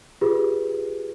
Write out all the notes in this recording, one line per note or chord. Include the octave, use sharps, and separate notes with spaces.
F4 G4 G#4 B4